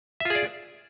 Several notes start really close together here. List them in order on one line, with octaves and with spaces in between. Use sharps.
E5 F4 G#4 D5